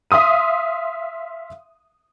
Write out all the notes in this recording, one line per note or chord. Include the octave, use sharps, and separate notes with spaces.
E5 F5 C6 D#6 D#7